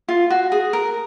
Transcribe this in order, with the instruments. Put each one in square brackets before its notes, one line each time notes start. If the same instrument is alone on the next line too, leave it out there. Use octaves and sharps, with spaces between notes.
[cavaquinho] F4
F#4
G#4
A#4